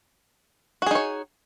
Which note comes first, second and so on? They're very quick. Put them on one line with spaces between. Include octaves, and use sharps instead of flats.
F#4 G#4 D#4 C#5